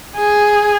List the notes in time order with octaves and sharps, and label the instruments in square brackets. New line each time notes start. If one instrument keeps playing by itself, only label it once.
[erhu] G#4